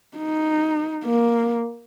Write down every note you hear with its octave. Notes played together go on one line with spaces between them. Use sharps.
D#4
A#3